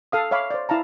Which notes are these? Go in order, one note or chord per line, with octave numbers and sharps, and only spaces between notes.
A4 F5 D#6
C#5 E5 F5 B5 D6
C5 D5
E4 F5 A5 A#5